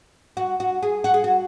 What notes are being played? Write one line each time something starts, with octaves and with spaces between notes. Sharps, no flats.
F#4
F#4
G#4
F#4
G#4
F#4